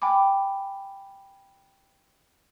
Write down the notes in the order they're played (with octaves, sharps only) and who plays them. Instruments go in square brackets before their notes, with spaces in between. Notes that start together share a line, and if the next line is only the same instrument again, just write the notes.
[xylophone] G5 G#5 B5 D6